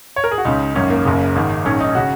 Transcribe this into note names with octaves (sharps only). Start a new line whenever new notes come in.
C#5
A#4
G#4
F#4
C#2 C#3 D#4
G#1 F#2 D#3 C#4
A#3
F#1 F#2 C#3
G#1 G#2 D#3
A#1 G#2 D#3 C#4
D#4
C#3 F#4